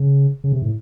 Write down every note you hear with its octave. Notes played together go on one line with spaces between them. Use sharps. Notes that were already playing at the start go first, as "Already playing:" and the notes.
Already playing: C#3
C#3
C3
A2